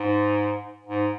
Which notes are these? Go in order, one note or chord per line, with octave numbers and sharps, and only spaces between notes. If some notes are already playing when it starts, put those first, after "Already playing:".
Already playing: G#2
G#2